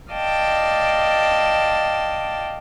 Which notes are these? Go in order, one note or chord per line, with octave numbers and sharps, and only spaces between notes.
D5 D#5 F5 G5 A5